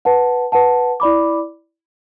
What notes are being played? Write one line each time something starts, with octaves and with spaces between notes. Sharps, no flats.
B4 F#5 A5
B4 F#5 A5
E4 D5 B5 D6